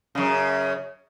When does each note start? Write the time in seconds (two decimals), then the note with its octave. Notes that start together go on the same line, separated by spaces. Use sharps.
0.15 F#2 C#3